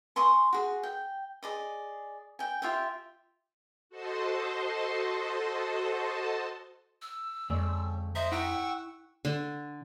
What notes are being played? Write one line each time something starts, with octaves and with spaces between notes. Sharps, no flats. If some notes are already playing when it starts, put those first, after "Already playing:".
G#5 C6 C#6 D#6
F#4 G#4
G5
G#4 D5 D#5
G5 G#5
F4 G4 E5 G5
F#4 A4 C5 D#5 A5 C6
E6
F2 D3 G#3 C#4 D5
C5 D#5 E5 A#5
E4 F#5 G5 C#6 E6
D3